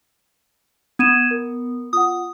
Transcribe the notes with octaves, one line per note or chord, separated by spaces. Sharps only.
B3 G#6 D#7 E7
A#4
F4 F#5 D#6